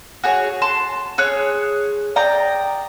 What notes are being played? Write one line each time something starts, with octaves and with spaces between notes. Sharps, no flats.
F#4 G#4 C#5
A5 C6
G#4 C#5 F#6
D5 G5 A#5 D#6